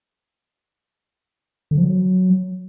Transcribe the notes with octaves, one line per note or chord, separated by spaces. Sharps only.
D3
F3
F#3